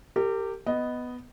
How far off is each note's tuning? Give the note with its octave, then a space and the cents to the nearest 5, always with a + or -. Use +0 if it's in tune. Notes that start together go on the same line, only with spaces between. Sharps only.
G4 +0 A#4 -35
B3 +5 D#5 +0